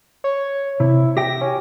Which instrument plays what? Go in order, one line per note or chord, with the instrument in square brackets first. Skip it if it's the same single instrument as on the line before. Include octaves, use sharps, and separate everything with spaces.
[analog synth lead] C#5
[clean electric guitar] C3 [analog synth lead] E4
[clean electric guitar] G4 E5 G5 [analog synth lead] A#6
[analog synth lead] C#4